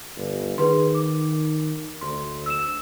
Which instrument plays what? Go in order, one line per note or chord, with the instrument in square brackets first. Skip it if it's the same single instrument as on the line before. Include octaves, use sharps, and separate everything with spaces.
[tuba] G1
[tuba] D#3 [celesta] G#4 B4 C6
[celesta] D6
[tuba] D2 [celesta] C6
[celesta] E6 E7